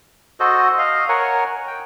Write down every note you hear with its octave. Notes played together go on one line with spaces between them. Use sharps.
F#4 A4 C5 D#5
D#5 F5
A#4 C#5 F#5 G#5
G5